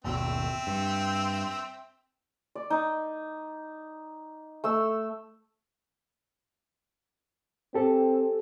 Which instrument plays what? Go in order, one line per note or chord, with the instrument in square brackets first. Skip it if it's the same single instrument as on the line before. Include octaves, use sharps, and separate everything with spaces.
[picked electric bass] G#1 D#2 B2 [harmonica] C4 E5 G5
[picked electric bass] G2
[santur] D5
D#4
A3 E6
[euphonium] C4 [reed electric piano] G4 A4